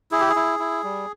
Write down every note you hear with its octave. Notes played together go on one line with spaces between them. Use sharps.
E4 G#4
G4
G#4
E4
E4
G3